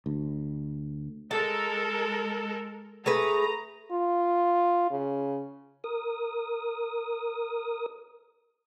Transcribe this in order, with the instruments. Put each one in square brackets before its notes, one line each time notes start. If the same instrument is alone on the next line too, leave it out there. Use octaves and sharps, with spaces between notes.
[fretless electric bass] D2
[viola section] G#3 A4 A#4 [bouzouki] A5
[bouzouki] A3 G#4 B4 [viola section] A#5
[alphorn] F4
C#3
[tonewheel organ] A#4 D#6